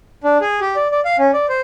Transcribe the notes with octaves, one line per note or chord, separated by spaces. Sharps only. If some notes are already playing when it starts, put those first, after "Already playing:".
D4
G#4
G4
D5
D5
F5
C#4
D5
C5